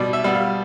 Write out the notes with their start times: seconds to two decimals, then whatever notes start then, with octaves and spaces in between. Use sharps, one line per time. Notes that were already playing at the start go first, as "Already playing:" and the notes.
Already playing: B2 G3 B3 D5
0.13 E5
0.24 G3 B3
0.35 F5